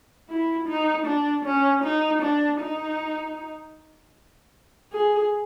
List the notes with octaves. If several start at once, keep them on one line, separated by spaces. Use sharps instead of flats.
E4
D#4
D4
C#4
D#4
D4
D#4
G#4